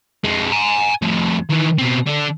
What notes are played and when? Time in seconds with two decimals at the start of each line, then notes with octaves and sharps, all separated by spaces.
0.24 F2 G#3
0.52 G#5 A#5
1.02 F2 A2
1.49 D#3 E3
1.78 B2 C4
2.07 D3 D4